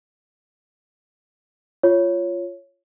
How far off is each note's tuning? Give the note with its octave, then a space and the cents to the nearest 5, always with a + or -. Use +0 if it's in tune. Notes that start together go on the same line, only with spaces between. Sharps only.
F4 -15 C#5 +0